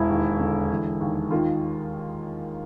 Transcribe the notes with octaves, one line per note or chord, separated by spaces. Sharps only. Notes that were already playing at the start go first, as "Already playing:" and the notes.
Already playing: E1 E4
D#2
D3
E3
D#2
D#3 F4